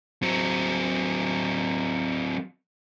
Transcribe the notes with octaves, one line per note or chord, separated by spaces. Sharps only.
F#3 C4